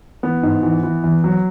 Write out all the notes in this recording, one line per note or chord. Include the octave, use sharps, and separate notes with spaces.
E3 B3
G#2
E3
E3
E2
F#3